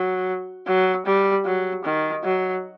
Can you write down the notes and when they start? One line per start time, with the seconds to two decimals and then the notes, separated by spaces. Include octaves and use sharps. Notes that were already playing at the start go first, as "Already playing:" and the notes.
Already playing: F#3
0.67 F#3
1.06 G3
1.45 F#3
1.84 D#3
2.24 F#3